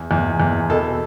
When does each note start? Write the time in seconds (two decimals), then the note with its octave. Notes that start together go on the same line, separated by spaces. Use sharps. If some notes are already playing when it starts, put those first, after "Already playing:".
Already playing: E2
0.11 E2
0.40 E2
0.70 B2 A4